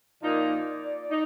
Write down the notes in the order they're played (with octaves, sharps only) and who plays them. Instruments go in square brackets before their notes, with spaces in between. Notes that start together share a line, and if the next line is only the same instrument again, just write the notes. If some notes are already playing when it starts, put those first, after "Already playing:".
[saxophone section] A#2 F3 A#3 D#4 [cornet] D5
[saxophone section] D#4